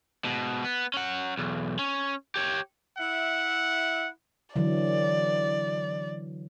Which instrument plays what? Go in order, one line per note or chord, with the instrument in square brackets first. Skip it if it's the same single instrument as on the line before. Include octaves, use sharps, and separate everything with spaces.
[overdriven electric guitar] G#2 B2
B3
C#4 F#5
B1 E2
C#4
G4 C#5
[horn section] E4 E5 F#5
[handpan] D3 E3 F#3 [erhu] D5